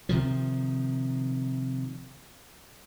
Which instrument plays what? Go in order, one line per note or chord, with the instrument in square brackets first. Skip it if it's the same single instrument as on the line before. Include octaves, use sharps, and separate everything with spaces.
[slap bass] C3 D#3 F3